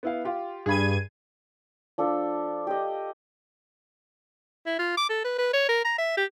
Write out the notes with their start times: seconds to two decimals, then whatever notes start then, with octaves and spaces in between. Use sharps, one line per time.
0.03 B3 E4 F5
0.25 F4 G4
0.66 G2 G#4 B5 G#6 D#7
1.98 F3 D4 A4
2.67 G4 D#5
4.66 E4
4.79 F4
4.97 D6
5.10 A4
5.24 B4
5.38 B4
5.53 C#5
5.69 A#4
5.85 A#5
5.98 E5
6.17 G4